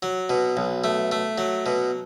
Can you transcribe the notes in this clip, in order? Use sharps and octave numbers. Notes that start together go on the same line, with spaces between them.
F#3
B2
B1
A3
A3
F#3
B2